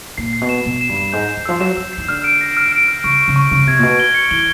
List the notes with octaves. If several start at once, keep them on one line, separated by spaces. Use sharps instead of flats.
A#2 C7
C7
B2
E7
B2 E7
E7
G2
E7
G#2 G6
E7
D#3
F3 E6
F#3 E7
F3 E6
D#3 C7
D3 F6
D7
A#6
F6
D7
F6
C#3 C#6
C#6
C#3
C#6
C#3 C#6
C3 G#6
A#2
B2 C#6
G7
C#7
E3 G7